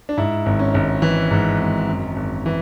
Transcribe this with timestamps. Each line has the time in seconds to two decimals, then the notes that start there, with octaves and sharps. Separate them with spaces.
0.09 D4
0.17 G#2 E4
0.46 G#1
0.59 C#4
0.74 G#1
1.02 E3
1.31 G#2
1.60 G#1
1.89 F#2
2.16 G#1
2.46 E3